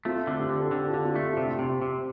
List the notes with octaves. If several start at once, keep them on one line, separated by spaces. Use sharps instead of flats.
A3 C4 F4
D3
D4 G4
D3
A4
D3 D4 G4
F4 A4
D3
C4 F4
A3
G4
C3 F4
D4 G4
C3
C3